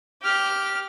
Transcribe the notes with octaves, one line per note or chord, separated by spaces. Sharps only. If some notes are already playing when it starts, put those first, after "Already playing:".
G4 F6